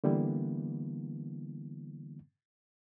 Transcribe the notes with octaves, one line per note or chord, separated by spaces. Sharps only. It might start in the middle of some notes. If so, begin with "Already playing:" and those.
D3 E3 G3 A#3 B3 E4